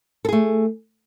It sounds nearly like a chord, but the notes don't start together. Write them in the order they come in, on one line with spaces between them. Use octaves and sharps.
A4 G#4 A3